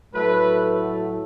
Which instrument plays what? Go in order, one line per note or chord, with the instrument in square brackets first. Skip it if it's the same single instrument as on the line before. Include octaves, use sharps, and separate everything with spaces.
[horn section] A2 F#3 A3 B4